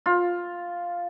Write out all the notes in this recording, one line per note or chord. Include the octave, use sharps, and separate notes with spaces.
F4